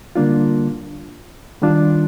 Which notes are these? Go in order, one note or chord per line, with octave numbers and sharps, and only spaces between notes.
D3 G3 A#3 D4 F4
D#3 G3 D4 F4